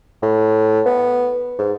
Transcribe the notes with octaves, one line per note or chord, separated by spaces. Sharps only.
A2
B3
G#2